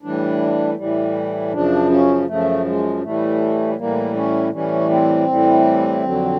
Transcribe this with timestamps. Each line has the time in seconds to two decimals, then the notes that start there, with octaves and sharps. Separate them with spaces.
0.02 A2 E3 G3 D4
0.77 A2 E3 G3
1.53 F#2 C#3 F3 D4
1.90 C#4
2.27 F#2 C#3 F3 A3
2.66 G#3
3.03 A2 E3 G3 A3
3.78 A2 E3 G3 A#3
4.15 C#4
4.53 A2 E3 G3 C#4
4.90 C4
5.28 A2 E3 G3
6.03 F2 D3 F#3